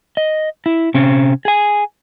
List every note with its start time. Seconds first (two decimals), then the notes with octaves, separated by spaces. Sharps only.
0.17 D#5
0.66 E4
0.94 C3 C4 C#4
1.45 G#4 G#5